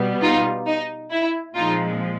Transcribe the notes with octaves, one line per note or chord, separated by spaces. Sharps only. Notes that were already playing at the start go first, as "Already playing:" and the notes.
Already playing: B2 G3 B3
D#4 F4
D#4
E4
A#2 F3 G#3 C4 D#4 F4